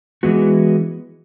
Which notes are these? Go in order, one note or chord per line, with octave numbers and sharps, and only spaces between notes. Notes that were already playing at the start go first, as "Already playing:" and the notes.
E3 G#3 B3 F#4